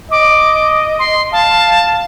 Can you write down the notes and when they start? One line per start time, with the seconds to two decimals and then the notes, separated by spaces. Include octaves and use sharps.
0.11 D#5 D6
0.99 C6
1.32 F5 A5